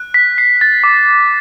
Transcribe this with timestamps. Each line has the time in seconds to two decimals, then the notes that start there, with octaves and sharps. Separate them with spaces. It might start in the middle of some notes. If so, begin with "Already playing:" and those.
Already playing: F#6
0.14 B6
0.38 C7
0.61 A6
0.84 D6